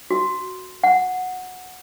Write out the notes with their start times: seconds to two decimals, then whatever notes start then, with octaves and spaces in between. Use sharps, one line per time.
0.11 F#4
0.83 F#5